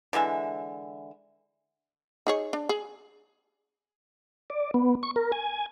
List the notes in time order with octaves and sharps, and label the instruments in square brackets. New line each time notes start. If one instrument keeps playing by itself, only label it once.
[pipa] D3 E3 G#3 E5
[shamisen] D#4 G#4 C#5
D4
G#4
[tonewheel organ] D5
B3
C#6
A#4
G#5